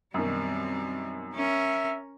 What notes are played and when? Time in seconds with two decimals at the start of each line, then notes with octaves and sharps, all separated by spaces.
0.14 F#2 B2 D#3 G3 C4
1.34 C#4 A#4 E5